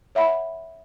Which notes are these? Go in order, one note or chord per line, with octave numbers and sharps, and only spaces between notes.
C#5 E5 F#5 B5